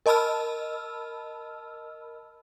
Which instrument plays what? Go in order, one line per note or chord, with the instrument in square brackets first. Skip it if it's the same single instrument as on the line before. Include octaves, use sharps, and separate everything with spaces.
[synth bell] A#4 D#5 A5 B5 E6 F6